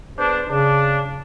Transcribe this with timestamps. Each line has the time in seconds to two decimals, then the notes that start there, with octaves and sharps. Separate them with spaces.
0.18 B3 D4 G#4 C5
0.49 C#3 D4